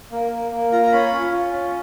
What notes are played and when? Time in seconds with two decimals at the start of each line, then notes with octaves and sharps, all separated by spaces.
0.12 A#3
0.31 A#3
0.51 A#3
0.72 F4 A#5
0.83 A#5
0.92 C#4 B5
1.12 C#4
1.33 F4
1.53 C#4